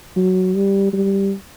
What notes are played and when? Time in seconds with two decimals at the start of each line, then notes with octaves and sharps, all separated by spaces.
0.17 F#3
0.55 G3
0.93 G3